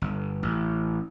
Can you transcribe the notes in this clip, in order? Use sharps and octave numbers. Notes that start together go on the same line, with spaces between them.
G1
A1